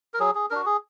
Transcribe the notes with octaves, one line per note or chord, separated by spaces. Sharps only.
A#4
F#3 G#4
G#4
D4 F#4 A#4
G#4